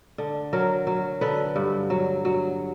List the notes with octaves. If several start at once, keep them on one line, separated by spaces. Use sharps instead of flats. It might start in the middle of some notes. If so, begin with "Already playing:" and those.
D3
F#3 A#4
F#3
D3 B4
G2
F#3
F#3